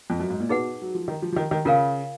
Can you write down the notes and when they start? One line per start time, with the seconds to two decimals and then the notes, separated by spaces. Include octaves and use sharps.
0.10 F2
0.20 F#2
0.30 G#2
0.40 A#2
0.49 B2 D#4 G#4 B4 F#5
0.82 F#3
0.95 F3
1.08 D#3
1.22 F3
1.32 F3
1.36 D#3
1.51 D#3
1.65 C#3 F4 A#4 F5 G#5